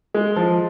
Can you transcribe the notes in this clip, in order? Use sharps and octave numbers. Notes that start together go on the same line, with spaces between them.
G#3
F3